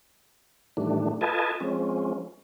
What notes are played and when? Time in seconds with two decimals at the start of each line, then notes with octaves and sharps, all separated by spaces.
0.77 A2 D#3 E3 G3 A3 D4
1.21 F4 A4 B4 D#5 G#5 A5
1.60 F3 G#3 C4 C#4